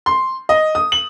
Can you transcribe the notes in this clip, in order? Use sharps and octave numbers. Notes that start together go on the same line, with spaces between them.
C6
D#5
D#6
F#7